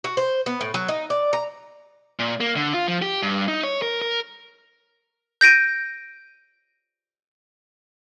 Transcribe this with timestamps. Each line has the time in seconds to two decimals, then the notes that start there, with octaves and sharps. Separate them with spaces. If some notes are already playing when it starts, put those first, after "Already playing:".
0.04 F#4
0.17 C5
0.46 B3
0.61 A2
0.74 F#3
0.88 D#4
1.10 D5
1.33 A#5
2.19 A#2
2.40 A#3
2.56 D3
2.74 F4
2.88 F3
3.02 G4
3.22 G2
3.48 D#4
3.63 C#5
3.82 A#4
4.02 A#4
5.41 G6 A#6 D7 D#7